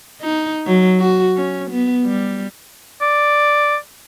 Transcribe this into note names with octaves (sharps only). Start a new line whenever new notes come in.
D#4
F#3
F#4
C#4
B3
G3
D5